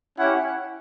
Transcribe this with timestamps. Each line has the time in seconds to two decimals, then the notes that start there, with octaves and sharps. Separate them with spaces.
0.19 C#4 E4 G4 F#5